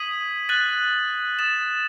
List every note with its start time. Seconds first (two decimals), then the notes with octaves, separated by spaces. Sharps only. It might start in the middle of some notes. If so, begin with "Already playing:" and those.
Already playing: D#6 G#6 B6 D#7 F#7
0.49 F#6 A6 D#7 F#7
1.39 D#6 A6 E7